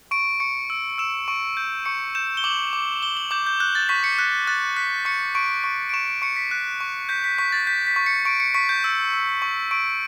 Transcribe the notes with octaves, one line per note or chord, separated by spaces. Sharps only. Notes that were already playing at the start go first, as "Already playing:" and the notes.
C#6 D7
C#6 C#7
E6 D7
E6 E7
C#6 D7
G6
C#6 C#7
G6 E7
G7
D6 F#7
D6
D6 G7
F#7
D6 G6
G6
F#6 G6
A6
C#6 B6
C#7
F#6 B6
F#6 A6
F#6 B6
C#6 C#7
C#6 D7
C#6
D7
C#6 E7
D7
C#6 C#7
B6
F#6
C#6
G6 B6
B6
C#6 B6
A6
G6 B6
B6
C#6
C#7
C#6 D7
C#7
C#6 B6
G6
E6
E6
C#6
C#6 D7